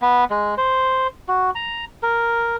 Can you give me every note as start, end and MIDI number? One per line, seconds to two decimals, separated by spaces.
0.02 0.24 59
0.30 0.55 56
0.57 1.07 72
1.28 1.50 66
1.55 1.85 82
2.03 2.56 70